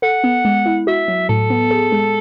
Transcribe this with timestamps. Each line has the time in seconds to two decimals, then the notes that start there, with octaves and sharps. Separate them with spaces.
0.02 A4 F#5
0.24 B3
0.45 G#3
0.66 E4
0.87 F#4 E5
1.08 F#3
1.29 A2 A4
1.50 B3
1.71 G#4
1.92 G#3